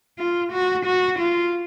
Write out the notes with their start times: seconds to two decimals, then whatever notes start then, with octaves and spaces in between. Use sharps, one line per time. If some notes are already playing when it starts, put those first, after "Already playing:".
0.19 F4
0.52 F#4
0.86 F#4
1.19 F4